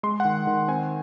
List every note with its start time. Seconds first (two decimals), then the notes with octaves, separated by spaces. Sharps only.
0.03 G#3 C6
0.20 D#3 F#5
0.47 D#3
0.68 C4 G#5